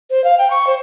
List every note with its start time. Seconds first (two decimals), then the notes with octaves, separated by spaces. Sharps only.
0.10 C5
0.24 F5
0.38 G5
0.51 C#6
0.67 C5